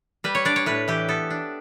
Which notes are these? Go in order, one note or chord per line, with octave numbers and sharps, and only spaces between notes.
G3 B4
C#5
D4 D5
C#5
A2 B4
E3 G4
B3 A4
D4